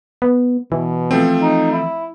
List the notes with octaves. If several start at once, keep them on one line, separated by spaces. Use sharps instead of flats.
B3
B2 E3
F3 A3 C4
D#4
E4